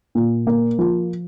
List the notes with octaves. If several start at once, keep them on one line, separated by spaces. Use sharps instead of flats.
A#2
A#3
F3